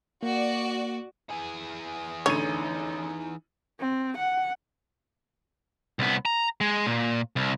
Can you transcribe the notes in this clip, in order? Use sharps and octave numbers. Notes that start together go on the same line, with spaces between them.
A#3 F#4 D5
E3 G#4
A1 D3 D#4 C#5 D#7
C4
F#5
C2 B3
A#5
G#3
A#2
C2